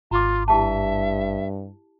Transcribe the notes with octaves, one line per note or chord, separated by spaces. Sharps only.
G#1 F4 A#5 D6
G2 E4 G4 E5 A5